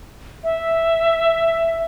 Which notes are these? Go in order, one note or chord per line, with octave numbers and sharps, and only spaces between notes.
E5